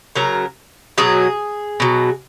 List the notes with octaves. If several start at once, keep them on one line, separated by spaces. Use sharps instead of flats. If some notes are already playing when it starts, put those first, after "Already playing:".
C#3 F#3 A#4
B2 F#3 G#4
B2 F#3